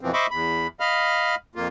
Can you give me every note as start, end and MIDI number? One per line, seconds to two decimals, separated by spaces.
0.01 0.12 41
0.01 0.12 47
0.01 0.12 52
0.01 0.12 53
0.01 0.12 60
0.13 0.27 72
0.13 0.27 75
0.13 0.27 76
0.13 0.27 83
0.13 0.27 85
0.13 0.27 86
0.31 0.67 40
0.31 0.67 83
0.80 1.35 75
0.80 1.35 77
0.80 1.35 83
0.80 1.35 89
1.55 1.68 41
1.55 1.68 58
1.55 1.68 65